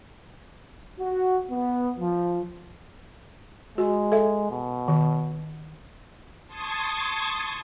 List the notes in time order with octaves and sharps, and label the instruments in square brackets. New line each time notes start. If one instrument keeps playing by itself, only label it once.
[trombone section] F#4
B3
F3
[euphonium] G#3 [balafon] F#4
[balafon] A4 E5
[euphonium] B2
[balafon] D#3
[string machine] A5 C6 C#6 D#6 G#6 A6